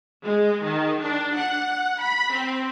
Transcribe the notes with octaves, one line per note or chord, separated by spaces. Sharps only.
G#3
D#3
D4
F#5
B5
C4